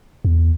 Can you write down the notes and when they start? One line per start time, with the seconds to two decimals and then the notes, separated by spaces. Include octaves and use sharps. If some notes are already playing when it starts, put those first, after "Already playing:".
0.25 E2